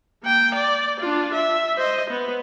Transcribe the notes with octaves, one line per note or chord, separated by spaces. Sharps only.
A#3 G5
D5
D4 F4
E5
C5 D#5
B3